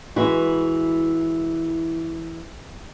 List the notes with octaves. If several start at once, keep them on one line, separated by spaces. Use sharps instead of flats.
E3 G#3 E4 F#4